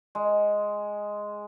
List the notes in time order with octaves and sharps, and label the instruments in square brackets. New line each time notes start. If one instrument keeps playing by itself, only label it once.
[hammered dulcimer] G#3